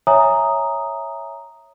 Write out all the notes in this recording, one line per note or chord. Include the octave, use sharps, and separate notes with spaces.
C#5 E5 G#5 A#5 D#6